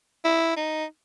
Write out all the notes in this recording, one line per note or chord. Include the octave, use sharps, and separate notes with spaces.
E4
D#4